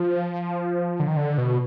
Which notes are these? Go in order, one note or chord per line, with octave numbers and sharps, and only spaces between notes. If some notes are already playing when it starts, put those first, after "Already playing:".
Already playing: F3
D3
D#3
D3
B2